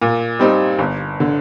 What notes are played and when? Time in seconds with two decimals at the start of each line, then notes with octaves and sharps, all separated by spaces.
0.02 A#2
0.39 G3 C4 D#4
0.79 G1
1.20 D3